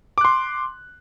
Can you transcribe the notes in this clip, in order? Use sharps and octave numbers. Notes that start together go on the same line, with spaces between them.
C6 D6 F#6